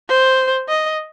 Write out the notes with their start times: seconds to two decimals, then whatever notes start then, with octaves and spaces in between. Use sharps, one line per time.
0.09 C5
0.69 D#5